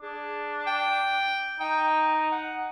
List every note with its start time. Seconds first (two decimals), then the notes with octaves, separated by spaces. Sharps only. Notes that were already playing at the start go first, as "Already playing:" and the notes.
0.02 D4 G#4
0.67 G5
1.60 D#4 G5
2.31 F#5